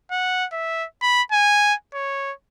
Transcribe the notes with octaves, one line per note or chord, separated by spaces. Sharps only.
F#5
E5
B5
G#5
C#5